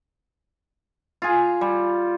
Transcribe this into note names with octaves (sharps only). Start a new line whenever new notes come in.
F4 G#4
G3